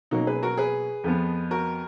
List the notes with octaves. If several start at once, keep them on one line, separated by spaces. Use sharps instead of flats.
B2 F#3 A#3 C#4 D#4 F#4
G#4 B4
F#4 A#4
G#4 B4
F2 F3 B3
F#4 A#4